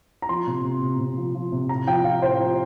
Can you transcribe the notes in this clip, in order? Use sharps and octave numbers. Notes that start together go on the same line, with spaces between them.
A#5
F3 C6
C3
C3
C3
C3
F3
F3
C3
A2 A#5
F3 G5
F3 F5
A2 C5
F3